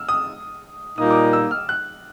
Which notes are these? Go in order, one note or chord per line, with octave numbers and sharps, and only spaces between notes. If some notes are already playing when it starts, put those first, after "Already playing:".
Already playing: E6 F6
D#6
A#2 G3 A#3 D#4 D#6
D6
D#6
E6
F6
F#6